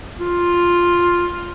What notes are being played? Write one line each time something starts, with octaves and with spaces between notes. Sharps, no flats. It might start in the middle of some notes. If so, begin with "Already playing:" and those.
F4